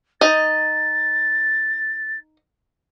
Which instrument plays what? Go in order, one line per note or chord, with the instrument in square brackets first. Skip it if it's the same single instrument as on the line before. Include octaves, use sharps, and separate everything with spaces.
[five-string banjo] D#4 D#5 [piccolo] A6